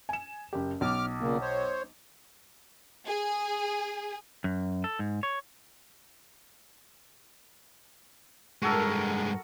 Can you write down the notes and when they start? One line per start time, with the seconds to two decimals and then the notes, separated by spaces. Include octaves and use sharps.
0.09 G#5 E7
0.53 F#1 G4
0.81 B1 D6 F6
1.21 A#2 C#3 A#3
1.41 C5 C#5
3.06 G#4
4.44 F#2
4.84 A4
4.99 G#2
5.23 C#5
8.62 G2 G#3 F#4 A4 A#4